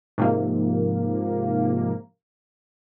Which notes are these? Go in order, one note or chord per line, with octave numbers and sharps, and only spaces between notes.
G#2 C3 F3 A#3